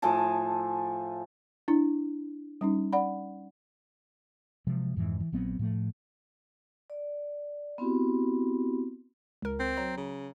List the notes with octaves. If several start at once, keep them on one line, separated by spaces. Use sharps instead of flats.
A2 F3 G#5 A5
D4 E4
G3 C#4 D#4
D5 F#5 B5
C3 F3 F#3 G#3
F2 G#2 E3
E3
A#1 F#3 B3 C4
A2 F3 A3
D5
B3 C4 E4 F#4 G4
C#2 A#4
C4
F#3 A#5
C#3